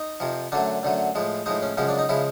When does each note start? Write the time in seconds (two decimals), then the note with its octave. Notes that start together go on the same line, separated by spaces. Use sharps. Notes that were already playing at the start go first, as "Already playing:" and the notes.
Already playing: D#4
0.20 F2 C3 F3
0.52 F#2 D3 F#3 A3 D4
0.83 F#2 D3 F#3 A3
1.15 A2 F3 G#3
1.46 A2 F3 G#3 D#4
1.62 C#4
1.77 F#2 C#3 F3 G#3 C#4
1.89 D4
1.99 D#4
2.09 C#3 F3 G#3 E4